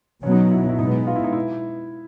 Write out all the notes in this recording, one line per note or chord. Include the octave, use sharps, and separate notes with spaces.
B2 F#3 B3 C#4
D#4
E4
E4
B2 G#3 B3 D#4
F4
E4
D#4
E4